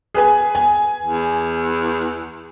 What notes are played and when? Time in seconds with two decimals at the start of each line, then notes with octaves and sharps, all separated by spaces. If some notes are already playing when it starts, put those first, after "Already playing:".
0.14 G#4 B4 G#5
0.55 G#5
1.02 E2